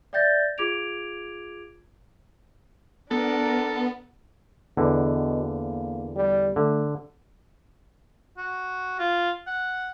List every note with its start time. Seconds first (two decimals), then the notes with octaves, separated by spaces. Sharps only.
0.13 D5 E5 G5 G6 A6 A#6
0.58 F4 G#4 D6 G#6 D7 F7
3.11 B3 D4 A4 A#4
4.77 E2 B2 D3
5.42 A#3
6.16 G3
6.56 D3 A3
8.38 F#4
8.99 F4
9.47 F#5